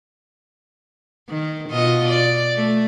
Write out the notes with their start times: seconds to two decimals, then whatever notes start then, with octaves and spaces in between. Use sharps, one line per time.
1.29 D#3
1.69 B2 F4 D#5
2.08 D5
2.56 A3